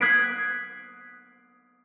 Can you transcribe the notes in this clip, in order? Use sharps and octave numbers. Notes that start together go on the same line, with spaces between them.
D#6 F#6 G#6 B6 C7 D7